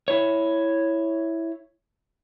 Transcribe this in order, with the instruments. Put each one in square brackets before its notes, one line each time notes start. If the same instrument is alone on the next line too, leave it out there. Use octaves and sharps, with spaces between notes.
[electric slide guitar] E4 C#5